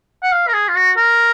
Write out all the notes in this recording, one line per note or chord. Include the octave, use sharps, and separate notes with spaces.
F#5
F5
A#4
G#4
F4
F#4
A#4